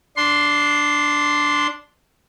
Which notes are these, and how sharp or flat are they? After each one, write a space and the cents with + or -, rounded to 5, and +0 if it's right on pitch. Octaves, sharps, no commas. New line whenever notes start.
D4 -5 C6 +0